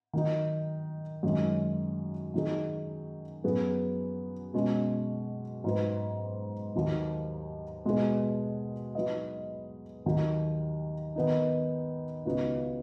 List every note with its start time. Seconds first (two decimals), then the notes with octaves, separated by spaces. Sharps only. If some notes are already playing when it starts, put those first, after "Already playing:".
0.13 D#3 F#3 D#4
1.23 F#2 D#3 G#3 C#4
2.34 D#3 F#3 D#4 G#4
3.44 F#2 F#3 B3 G#4
4.54 B2 G#3 C#4
5.64 G#2 F#3 D#4 B4
6.75 D#2 D#3 F#3 D#4
7.85 B2 G#3 B3 G#4
8.95 F#3 D#4 B4 D#5
10.06 D#2 D#3 F#3
11.16 D#3 B3 D#4
12.25 C#2 C#3 B3 D#4 F#4